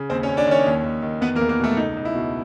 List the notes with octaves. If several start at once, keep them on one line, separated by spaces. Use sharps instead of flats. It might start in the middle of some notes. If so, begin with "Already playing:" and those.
Already playing: C#3
D#2 C4 C5
C#4 C#5
D#2
D4 D5
D#3 C#4 C#5
D#2
D#2
D#3
E2 B3 B4
A#3 A#4
E2
A#3 A#4
B2 A3 A4
C#2 D#4
C#2
E4
B2